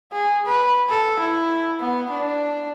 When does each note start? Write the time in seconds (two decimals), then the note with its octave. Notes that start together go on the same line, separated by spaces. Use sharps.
0.12 G#4
0.46 B4
0.89 A4
1.19 E4
1.80 B3
2.10 D4